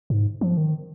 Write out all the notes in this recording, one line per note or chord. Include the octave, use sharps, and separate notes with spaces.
G#2
F3
D#3